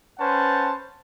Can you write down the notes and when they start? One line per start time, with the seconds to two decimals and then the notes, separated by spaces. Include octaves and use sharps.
0.19 C#4 B4 C5 F#5 A5